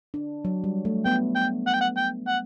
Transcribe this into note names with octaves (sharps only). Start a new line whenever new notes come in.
D4
F#3
G3
A3
B3 G5
G5
F#5
G5
F#5
G5
F#5